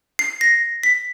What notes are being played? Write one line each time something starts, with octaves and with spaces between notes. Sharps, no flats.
C7
A#6
B6